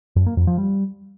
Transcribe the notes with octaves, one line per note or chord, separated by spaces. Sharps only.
F#2
A#3
F2
F3
G3